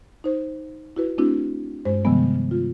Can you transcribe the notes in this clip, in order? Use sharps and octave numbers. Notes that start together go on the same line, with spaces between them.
D#4 C5
E4 F#4 B4
A3 C4 D4 E4 F#4
G2 G#3 C5
C3 D#3 F3 G3 G#3 B3
F4